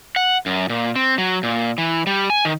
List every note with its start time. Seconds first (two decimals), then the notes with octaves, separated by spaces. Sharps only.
0.16 F#5
0.46 F#2
0.69 A#2
0.96 C4
1.18 F#3
1.43 A#2
1.78 E3
2.07 G3
2.30 G#5
2.45 D#3